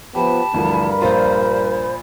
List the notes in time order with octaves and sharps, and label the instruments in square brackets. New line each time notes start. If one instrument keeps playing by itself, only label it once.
[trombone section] F3 B3 [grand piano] G4 [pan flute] A5 [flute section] B5
[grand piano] D2 E3 F3 [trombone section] G2 A#4
[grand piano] A#1 F4 [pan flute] C5